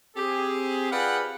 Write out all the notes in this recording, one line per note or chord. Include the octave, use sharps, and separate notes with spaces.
C4 G4 G#4
F4 G#4 B4 D5 F#5 G5